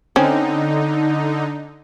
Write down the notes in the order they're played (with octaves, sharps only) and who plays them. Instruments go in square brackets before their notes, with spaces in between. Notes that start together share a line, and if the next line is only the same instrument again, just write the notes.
[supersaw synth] D3 D#4 [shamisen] C4 C#4